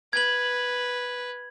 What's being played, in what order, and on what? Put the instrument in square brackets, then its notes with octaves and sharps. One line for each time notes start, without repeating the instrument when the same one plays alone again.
[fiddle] B4 [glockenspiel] G#6 F#7